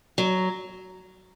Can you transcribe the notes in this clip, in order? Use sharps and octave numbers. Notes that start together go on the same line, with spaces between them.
F#3